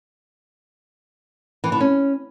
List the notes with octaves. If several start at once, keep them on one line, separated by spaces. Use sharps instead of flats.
E3
D3
C#4